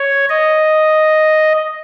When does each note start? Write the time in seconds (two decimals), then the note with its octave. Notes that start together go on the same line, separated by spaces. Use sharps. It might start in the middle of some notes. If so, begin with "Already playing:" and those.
Already playing: C#5
0.30 D#5